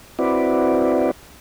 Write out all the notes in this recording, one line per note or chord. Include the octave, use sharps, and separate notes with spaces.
C4 E4 F#4 B4 D5